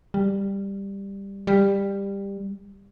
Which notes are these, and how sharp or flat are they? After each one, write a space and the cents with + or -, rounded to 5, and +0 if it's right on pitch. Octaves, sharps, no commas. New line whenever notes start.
G3 +10
G3 +15